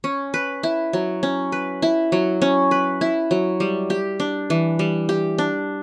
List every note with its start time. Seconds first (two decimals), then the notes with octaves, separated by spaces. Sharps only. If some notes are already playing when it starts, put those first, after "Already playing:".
0.04 C#4
0.34 B4
0.63 E4
0.93 F#3
1.23 C#4
1.52 B4
1.82 E4
2.12 F#3
2.42 C#4
2.71 B4
3.01 E4
3.31 F#3
3.60 G3
3.90 G4
4.20 D4
4.50 E3
4.79 G3
5.09 G4
5.38 D4